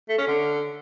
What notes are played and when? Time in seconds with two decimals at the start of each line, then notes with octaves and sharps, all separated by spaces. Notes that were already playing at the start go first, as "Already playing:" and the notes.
0.09 A3
0.18 C#4
0.27 D3